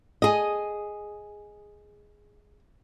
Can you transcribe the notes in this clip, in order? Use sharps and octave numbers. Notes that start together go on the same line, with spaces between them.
G#4 D#5